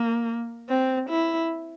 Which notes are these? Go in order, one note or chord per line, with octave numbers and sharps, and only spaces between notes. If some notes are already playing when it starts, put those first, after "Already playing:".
Already playing: A#3
C4
E4